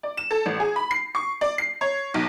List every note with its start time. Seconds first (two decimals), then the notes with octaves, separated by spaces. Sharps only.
0.03 D5
0.17 E7
0.31 A4
0.46 A1
0.60 G#4
0.76 B5
0.91 C7
1.15 C#6
1.41 D5
1.58 C7
1.81 C#5
2.14 B1